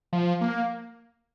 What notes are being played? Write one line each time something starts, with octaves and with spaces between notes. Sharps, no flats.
F3
A#3